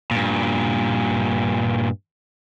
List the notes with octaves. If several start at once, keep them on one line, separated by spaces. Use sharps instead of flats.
G2 A#2